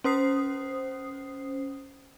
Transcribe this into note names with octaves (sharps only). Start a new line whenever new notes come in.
C#4 C5 D#6 C7